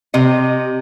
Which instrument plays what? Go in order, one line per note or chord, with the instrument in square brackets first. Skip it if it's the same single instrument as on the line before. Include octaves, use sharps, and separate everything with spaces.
[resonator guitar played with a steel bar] C3 D#5